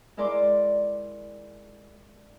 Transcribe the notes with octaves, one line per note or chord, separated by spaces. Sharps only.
G#3 E4 A#4 D5 C6 D6